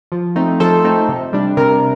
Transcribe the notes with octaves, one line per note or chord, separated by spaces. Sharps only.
F3
A3 C4 D#4
F3 A4 C5
A3 C4 D#4
C3
G3 D4
C3 A#4